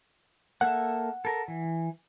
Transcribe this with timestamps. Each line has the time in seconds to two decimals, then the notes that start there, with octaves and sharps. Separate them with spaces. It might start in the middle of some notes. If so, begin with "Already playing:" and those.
0.61 A#3 A4 E5 F#5
1.25 A4 A#4
1.48 E3